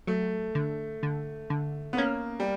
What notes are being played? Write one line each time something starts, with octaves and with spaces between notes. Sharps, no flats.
F#3 A3
D3
D3
D3
B3
A#3 C#4
G3